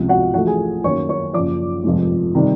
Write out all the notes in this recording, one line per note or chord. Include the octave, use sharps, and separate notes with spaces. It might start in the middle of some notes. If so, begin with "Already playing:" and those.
Already playing: C#2 C3 F3
F#4 F#5
A1 A2 F3 A3 F#4 F#5
G#4 G#5
F#2 D#3 F#3 A#3 C#5 C#6
C#5 C#6
F#1 F#2 C#3 F3 D5 D6
F1 F2 C3 F3 G#3
C3 D#3 G3